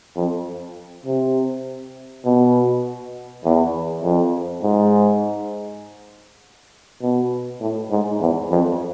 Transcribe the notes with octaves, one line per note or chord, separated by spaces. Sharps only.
F2
C3
B2
E2
F2
G#2
B2
A2
G#2
E2
F2